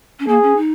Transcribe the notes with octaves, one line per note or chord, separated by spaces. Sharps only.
C#4
A#3 G#4
C#4
D#4